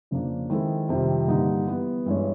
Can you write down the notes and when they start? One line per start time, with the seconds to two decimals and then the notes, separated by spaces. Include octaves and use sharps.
0.11 F2 C#3 F3 A#3 D4
0.50 D#3 G#3 C4 E4 A4
0.89 F2 C3 D#3 G3
1.28 G2 D3 G3 A#3 D#4
1.67 E3 G3 B3
2.06 G2 E3 G#3 C#4